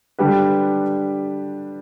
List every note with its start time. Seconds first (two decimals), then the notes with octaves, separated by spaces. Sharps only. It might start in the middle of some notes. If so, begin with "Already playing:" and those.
0.19 D3 G3 D4 G4 B4